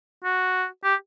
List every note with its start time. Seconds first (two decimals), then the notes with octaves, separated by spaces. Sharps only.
0.24 F#4
0.84 G4